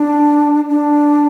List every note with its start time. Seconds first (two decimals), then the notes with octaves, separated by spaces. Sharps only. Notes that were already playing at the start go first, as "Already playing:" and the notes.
Already playing: D4
0.69 D4